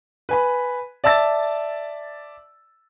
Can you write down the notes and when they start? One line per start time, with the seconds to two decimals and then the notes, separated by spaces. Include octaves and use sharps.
0.29 B4 G#5 B5
1.04 D5 E5 A5 E6 A6